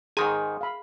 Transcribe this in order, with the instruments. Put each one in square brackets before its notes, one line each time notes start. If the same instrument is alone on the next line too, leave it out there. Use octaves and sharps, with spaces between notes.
[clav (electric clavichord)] G#2 D#3 G#5 [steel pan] G#4 A#5 C6
[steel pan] F5 B5